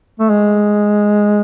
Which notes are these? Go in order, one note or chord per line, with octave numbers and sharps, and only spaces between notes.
A3
G#3